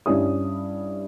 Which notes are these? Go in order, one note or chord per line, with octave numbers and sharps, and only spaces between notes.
G2 G3 C#4 E4 D#6